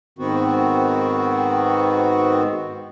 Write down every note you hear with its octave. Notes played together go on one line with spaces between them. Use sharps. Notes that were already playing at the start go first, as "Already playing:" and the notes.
G#2 D#3 B3 C4 F#4